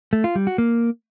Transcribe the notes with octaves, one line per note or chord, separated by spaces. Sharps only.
A3
F4
G3
F#4
A#3